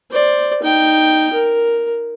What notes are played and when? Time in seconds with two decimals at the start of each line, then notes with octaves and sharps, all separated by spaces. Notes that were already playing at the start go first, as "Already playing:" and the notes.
0.11 C5 D5
0.63 D#4 G5
1.33 A#4